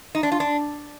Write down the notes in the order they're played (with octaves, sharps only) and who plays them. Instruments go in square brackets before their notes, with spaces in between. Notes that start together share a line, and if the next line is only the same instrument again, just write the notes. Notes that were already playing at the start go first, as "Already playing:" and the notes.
[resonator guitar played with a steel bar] D#4
D4
F4
D4